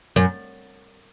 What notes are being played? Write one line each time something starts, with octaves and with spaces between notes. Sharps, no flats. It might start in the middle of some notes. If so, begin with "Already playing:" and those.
F#2